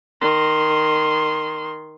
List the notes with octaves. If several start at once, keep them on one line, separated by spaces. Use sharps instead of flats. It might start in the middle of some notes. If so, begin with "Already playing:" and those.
D#3 C6